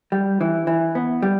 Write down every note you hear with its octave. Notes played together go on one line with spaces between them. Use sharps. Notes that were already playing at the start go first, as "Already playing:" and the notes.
G3
E3
E3
B3
G3